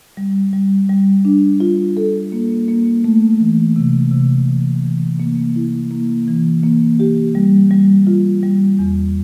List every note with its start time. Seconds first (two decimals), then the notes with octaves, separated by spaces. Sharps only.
0.17 G3
0.53 G3
0.89 G3
1.25 D4
1.60 F4
1.97 A4
2.32 A#3
2.68 A#3
3.04 A3
3.40 E3
3.76 C3
4.12 C3
4.48 E3
4.84 E3
5.20 A#3
5.56 E4
5.91 A#3
6.27 E3
6.63 A#3
7.00 G4
7.35 G3
7.71 G3
8.07 F4
8.43 G3
8.79 E2